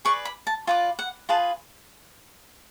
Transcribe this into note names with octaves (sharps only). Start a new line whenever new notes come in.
G#4 B4 D5 C#6
B5
A5
F4 B4 D5 G#5
F#5
F4 G#4 B4 A5